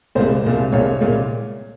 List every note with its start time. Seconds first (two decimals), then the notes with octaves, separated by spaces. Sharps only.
0.15 C2 A#2 G#3 C5
0.44 C2 A#2 G#3
0.72 C2 A#2 G#3 C#5
1.01 C2 A#2 G#3